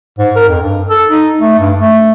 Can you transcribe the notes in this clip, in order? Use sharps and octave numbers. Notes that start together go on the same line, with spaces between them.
G#2
A#4
F2
G2
A4
D#4
A3
G2
A3